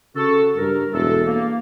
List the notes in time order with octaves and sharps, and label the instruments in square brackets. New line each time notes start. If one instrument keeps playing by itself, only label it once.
[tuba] C#3 [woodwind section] F#4 A4
[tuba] G2 [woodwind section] A#4
[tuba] E1 [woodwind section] A3 D4 A4
[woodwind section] A#3